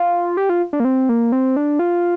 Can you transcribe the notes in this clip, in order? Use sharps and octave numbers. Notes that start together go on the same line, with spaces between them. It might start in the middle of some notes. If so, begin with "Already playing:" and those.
Already playing: F4
G4
F4
D4
A#3
C4
A#3
C4
D4
F4